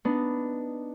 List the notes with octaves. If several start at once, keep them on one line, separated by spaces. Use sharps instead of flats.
B3 D4 D#4